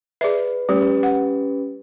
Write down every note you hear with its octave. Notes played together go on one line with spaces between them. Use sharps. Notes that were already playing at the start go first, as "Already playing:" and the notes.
G#4 B4 D5 E5
G3 A3 C#4 G4 B4
F#5